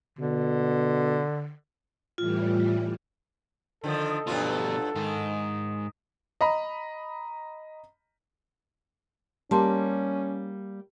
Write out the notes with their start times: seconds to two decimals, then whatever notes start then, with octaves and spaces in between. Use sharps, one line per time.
0.19 B2 D3
2.18 A2 E3 G3 F4
3.84 D3 D#3 F3 A4
4.27 G2 B2 F3 F#3 F4
4.95 G#2 D#3
6.41 D#5 A#5 B5
9.51 G3 A#3 C#4 A5 C6